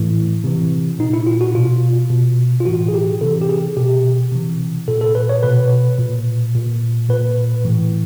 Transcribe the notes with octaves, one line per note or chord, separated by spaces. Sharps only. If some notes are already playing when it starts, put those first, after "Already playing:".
Already playing: A2 E3
C3 E3
A#2 D#4
E4
F4
F#4
B2 F4
B2
F4
A2 E3 F#4
G#4
G4
C3 E3 A4
G4
G#4
B2 G4
C3 E3
A#2 A4
A4
B4
C#5
B2 B4
A#2
A#2
A#2 B4
A2 E3